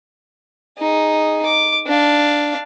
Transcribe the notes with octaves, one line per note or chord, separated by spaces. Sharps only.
D#4 G#4
D6
D4 F5